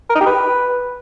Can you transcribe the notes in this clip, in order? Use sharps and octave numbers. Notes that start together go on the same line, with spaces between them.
A#4
D#4
G4
B4